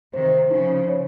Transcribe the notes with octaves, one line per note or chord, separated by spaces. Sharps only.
C3 D#3 C5
C#3 F3 D#4
C#5